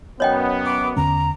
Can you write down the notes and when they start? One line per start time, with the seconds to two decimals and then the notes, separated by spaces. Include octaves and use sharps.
0.20 F#2 B3 C#5 D#5 G5
0.65 D6
0.97 E2 D3 C#4 A#5